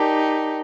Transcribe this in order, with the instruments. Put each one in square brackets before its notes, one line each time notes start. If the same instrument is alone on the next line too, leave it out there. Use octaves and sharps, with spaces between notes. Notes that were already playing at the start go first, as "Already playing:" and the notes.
Already playing: [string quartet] D#4 G4 [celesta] A#4 D5 A5 D6